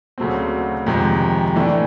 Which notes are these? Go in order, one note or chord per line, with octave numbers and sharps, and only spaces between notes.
D2 C#3 F#3 A3 C4
F2 C3 D#3 G#3
A2 E3 A3 D4